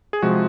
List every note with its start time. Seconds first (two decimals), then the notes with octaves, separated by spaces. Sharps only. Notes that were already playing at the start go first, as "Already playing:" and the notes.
0.13 G#4
0.22 C3 F3 G#3 F#4